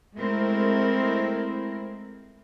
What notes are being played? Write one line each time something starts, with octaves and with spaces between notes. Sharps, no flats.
G#3 A3 C4 E4 A#4